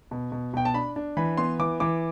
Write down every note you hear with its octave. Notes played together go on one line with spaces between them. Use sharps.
B2
B2
B2 G5
A5
D4 B5
D4
E3 B5
B3 C6
E3 D6
E3 D6